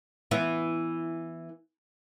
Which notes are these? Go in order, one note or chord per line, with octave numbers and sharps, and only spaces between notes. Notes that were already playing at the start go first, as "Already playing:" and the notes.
E3 B3